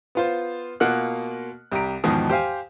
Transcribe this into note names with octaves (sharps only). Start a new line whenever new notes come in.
B3 F4 C5
B2 A#3 F4 F#5 F6 F#6
C2 G4 A#5 D7
E2 G#2 B2 D#3 F3
G4 C5 F5 G#5